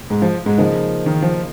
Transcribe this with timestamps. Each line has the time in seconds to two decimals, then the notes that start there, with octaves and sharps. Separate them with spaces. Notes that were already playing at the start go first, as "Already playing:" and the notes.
Already playing: F1
0.10 G#2 G#3
0.22 F3
0.46 G#2 G#3
0.58 C#2 C#3 F3 A#3 D#4
1.06 D#3
1.22 F3